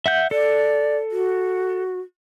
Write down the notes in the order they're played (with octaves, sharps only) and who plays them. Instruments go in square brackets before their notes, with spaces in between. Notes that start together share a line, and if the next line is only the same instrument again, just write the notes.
[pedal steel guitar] E5 F#5 G6
[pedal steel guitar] A4 [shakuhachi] D5
[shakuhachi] F#4